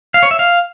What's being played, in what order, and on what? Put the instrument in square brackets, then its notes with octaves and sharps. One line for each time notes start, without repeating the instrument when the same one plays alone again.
[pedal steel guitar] F5
C#5
E5
F5